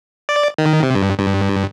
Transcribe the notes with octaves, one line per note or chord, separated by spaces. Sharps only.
D5
D#3
C3
G2
G2